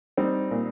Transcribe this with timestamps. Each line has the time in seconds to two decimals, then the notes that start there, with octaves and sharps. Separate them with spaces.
0.17 G3 C4 D#4
0.51 A#2